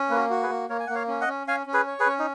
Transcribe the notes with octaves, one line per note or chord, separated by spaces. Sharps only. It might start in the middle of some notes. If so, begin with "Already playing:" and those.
Already playing: C#4
A#3 B4
F#4 A#4
F#4
G#4 B4
A#3
A#3 A#4 C#5
G#5
A#3 F#5
C#5 F5
C#4
D#5 F#5
C#4
C#4 F5 G#5
C#4
G#4 B4
C#5
G#4 B4
C#4
D#4